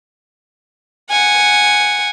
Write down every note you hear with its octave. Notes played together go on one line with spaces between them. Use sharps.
F#5 G#5